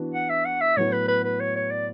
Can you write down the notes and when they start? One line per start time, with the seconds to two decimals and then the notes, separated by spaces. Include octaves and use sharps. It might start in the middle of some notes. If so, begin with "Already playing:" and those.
Already playing: E3 B3 D4 F#4
0.14 F#5
0.30 E5
0.45 F#5
0.61 E5
0.77 A2 F#3 B3 E4 C#5
0.93 B4
1.08 B4
1.24 B4
1.40 C#5
1.56 C#5
1.71 D5